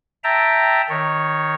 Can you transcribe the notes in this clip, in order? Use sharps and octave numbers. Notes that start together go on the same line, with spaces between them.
E5 G5 A5 A#5
D#3 C#5